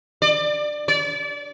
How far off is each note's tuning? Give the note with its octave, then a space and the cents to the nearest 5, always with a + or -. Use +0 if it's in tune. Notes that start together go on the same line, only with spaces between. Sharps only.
D5 +20
D5 -30